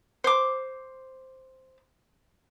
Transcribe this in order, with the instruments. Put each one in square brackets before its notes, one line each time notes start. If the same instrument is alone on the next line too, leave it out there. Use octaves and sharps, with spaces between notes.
[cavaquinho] C5 D6